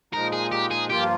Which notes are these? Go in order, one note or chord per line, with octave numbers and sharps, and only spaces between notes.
A#2 F3 G#3 D#4 A#4
G#4
G4
G#4
G2 F3 A#3 F4 G4